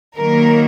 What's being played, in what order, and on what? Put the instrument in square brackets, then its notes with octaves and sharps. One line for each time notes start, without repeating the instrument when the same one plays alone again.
[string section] D#3 F#3 A#3 A#4